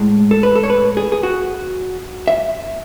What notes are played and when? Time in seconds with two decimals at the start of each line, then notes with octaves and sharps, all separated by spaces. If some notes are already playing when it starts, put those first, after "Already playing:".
Already playing: A2 G#3
0.31 A4
0.43 B4
0.55 A4
0.64 C#5
0.70 B4
0.97 G#4
1.12 G#4
1.23 F#4
2.28 E5